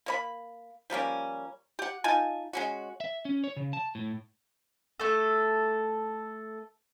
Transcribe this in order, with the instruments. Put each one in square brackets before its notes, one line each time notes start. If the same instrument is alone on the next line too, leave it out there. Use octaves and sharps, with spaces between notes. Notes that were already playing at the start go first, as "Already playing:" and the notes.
[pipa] A#3 C#5 B5
F3 G3 A#3 C#4
G4 F#5
D#4 F4 G#5 A5
G#3 C#4 F#4
[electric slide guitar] E5
C#4
C#5
C#3
A5
A2
[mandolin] A3 A4